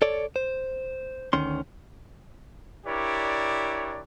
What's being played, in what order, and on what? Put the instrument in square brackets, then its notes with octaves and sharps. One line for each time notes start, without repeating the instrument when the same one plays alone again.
[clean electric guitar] A4 C#5 D5
C5
D2 D#3 C#4 C6
[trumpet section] D4 E4 G4 A#4 C#5 D5